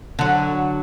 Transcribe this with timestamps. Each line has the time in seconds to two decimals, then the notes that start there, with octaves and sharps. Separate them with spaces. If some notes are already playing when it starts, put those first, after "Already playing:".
0.19 D3 F#3